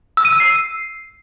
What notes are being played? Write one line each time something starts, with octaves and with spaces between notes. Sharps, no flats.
E6
D#7
E6
C7